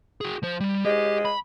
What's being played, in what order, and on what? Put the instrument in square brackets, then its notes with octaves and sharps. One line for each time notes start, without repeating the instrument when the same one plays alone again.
[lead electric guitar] F#4 G#4
F3 C5
G3
[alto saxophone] G#3 [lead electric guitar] G4
[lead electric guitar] B5